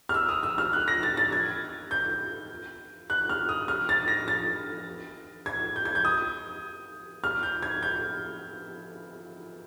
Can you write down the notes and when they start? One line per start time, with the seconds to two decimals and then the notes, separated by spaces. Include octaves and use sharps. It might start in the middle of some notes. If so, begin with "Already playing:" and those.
0.09 F6
0.14 E6
0.29 D#6
0.43 E6
0.58 F6
0.73 F#6
0.88 A#6
1.03 A6
1.17 A6
1.32 G#6
1.91 G6
3.10 F#6
3.29 F6
3.49 D#6
3.68 F6
3.89 A6
4.08 A#6
4.28 A6
5.46 G#6
5.76 G6
5.85 G#6
5.95 G6
6.05 D#6
7.24 F6
7.43 G6
7.63 G#6
7.83 G6